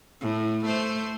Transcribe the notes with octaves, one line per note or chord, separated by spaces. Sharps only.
A2
A3 C5